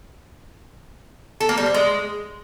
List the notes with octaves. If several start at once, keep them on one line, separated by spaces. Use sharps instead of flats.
A4
A#3
G3
C4
G#3